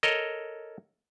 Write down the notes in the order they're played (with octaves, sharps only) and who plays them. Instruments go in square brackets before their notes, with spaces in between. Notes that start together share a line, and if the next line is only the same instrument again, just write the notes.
[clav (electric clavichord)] A4 A#4 C#5 D#5